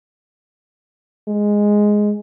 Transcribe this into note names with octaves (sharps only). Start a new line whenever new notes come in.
G#3